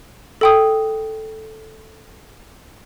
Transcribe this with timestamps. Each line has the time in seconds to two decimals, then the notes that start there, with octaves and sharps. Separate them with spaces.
0.41 A4 G5 D#6